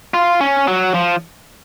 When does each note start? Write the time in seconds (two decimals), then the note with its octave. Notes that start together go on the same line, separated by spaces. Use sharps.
0.14 F4
0.41 C#4
0.68 F#3
0.94 F3